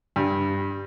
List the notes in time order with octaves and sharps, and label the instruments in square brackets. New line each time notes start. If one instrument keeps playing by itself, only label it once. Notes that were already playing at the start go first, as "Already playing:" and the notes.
[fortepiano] G2